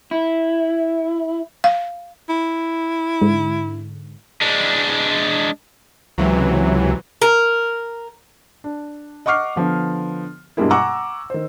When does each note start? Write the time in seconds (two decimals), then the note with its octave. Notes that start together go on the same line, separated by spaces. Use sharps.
0.11 E4
1.64 F5
2.30 E4
3.21 G#2 D3
4.41 G#3 D4
6.18 C#2 C3 E3 F#3
7.22 A#4
8.64 D4
9.26 D#5 F#5 C#6 D6 F6 C7
9.56 D3 F3 B3
10.57 G2 B2 G3 G#3 A#3 E4
10.71 F#5 G#5 A#5 C#6 D6 E6
11.30 D#3 C5